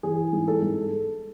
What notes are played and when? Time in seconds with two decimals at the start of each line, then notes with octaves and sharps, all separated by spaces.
0.03 E3 G#4
0.33 G#2
0.48 A4
0.62 G#2